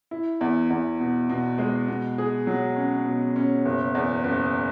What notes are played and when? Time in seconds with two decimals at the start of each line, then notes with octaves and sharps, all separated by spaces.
0.11 E4
0.41 E2
0.70 E2
1.00 B2
1.29 B2
1.58 G#3
1.88 B2
2.18 G#4
2.47 F#3
2.76 C#4
3.07 B2
3.36 C#4
3.66 F#1
3.95 E2
4.24 F#1